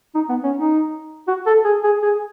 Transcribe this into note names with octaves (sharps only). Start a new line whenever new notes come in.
D#4
B3
C#4
D#4
F#4
A4
G#4
G#4
G#4